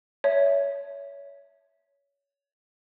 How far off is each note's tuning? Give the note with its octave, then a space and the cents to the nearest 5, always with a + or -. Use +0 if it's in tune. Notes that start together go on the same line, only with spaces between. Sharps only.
C#5 +25 E5 +0